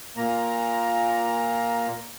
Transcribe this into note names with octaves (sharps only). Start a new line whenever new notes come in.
A#2 A#3 A#5